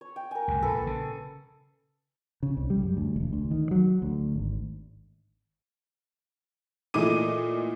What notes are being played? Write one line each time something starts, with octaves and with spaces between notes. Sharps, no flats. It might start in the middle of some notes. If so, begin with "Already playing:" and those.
C#5
G5
A#4 G#5
C#2 F#2 C3
A#1 A#2 A4 B4
C#3
C#3
C2
G3
F#2
D2
E1
D2
D#3
F#3
D2
G#1
A#2 E3 A3 D#5 D6 D#7